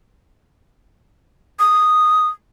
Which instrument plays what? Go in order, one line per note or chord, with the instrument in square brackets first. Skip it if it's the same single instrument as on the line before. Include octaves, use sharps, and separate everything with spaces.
[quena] D#6